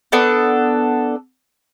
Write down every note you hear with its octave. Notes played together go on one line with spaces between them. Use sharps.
B3 D4 A4